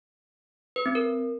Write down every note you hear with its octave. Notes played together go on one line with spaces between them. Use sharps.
B4
C4
A#4